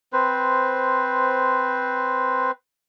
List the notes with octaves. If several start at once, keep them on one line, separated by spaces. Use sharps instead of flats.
C4 B4 C5